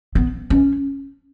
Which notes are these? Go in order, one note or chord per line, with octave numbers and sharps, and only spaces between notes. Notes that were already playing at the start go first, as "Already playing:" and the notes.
B3
C#4